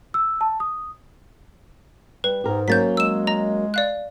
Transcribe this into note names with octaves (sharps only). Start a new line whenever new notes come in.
E6
A5
D#6
G3 B4
G#2 G4 A#4
F#3 A#3 C#4 G6 A6 B6
G#3 E6 E7
D#5 A#5
D5 F5 F#6